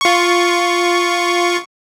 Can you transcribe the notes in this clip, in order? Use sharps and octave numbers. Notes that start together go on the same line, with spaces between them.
F4 C#6